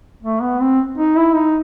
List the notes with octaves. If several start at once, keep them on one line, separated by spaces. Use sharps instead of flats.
A3
B3
C4
D#4
E4
D#4